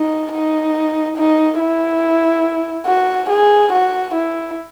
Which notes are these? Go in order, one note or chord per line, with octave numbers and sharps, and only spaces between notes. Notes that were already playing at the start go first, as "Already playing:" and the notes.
Already playing: D#4
D#4
D#4
E4
F#4
G#4
F#4
E4